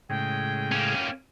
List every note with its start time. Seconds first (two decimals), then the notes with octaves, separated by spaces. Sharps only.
0.10 A2 C#3 G#3 G5
0.72 A#3 C#4